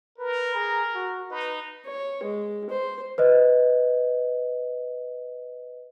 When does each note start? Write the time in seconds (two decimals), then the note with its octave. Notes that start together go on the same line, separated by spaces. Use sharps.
0.18 A#4 B4
0.53 G#4 A#5
0.95 F#4
1.31 D#4 B4
1.85 C#5
2.23 G#3
2.70 C5
3.18 B4 C5 D#5